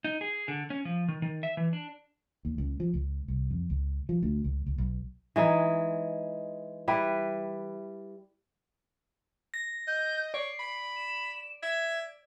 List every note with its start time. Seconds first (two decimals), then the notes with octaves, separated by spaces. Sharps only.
0.04 D#4
0.21 G#4
0.48 D3
0.70 C#4
0.85 F3
1.08 D#3
1.22 D#3
1.43 E5
1.57 E3
1.73 D4
2.45 D#2
2.58 C#2
2.80 F3
2.94 C#2
3.28 C2
3.51 F2
3.70 C#2
4.09 F3
4.23 D2
4.44 C#2
4.66 C#2
4.78 B1
5.36 E3 G#3 D#4
6.88 G3 E4 B4
9.54 A#6
9.87 D#5 G6
10.34 C#5 D5 C7
10.59 B5
10.96 E7
11.63 E5 G#6